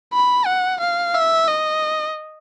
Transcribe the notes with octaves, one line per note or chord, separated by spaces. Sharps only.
B5
F#5
F5
E5
D#5